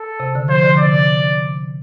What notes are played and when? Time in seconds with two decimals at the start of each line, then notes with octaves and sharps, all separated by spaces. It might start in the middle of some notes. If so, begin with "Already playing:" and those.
Already playing: A4
0.20 C3
0.35 D3
0.49 F3 C5
0.63 D3
0.79 C3 D5